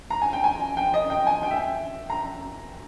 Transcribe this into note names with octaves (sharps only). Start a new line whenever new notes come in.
A#5
G#5
G5
G#5
G5
D#5
G5
G#5
G5
E5
G5
A#5